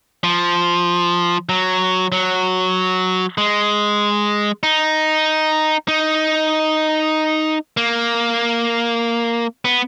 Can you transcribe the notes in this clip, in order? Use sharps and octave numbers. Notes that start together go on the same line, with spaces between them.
F3
F#3
F#3
G#3
D#4
D#4
A#3
B3